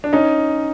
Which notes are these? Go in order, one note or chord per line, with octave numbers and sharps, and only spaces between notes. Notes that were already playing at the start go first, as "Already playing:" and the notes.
D4
C#4 D#4